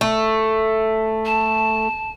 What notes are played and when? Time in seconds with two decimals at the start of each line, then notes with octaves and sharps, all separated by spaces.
0.01 A3
1.25 A5